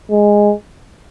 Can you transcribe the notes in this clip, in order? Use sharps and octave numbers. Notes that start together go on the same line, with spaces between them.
G#3